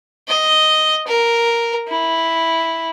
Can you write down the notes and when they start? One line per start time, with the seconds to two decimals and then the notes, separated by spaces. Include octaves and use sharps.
0.28 D#5
1.07 A#4
1.88 E4